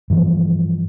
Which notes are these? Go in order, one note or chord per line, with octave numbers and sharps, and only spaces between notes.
G2 E3 F3